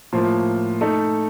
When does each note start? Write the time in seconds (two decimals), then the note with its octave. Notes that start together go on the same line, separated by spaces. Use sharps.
0.13 A2 F3 A#3 F4
0.81 A3 D#4 A4